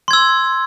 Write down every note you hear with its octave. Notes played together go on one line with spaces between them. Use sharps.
C6 E6 G#6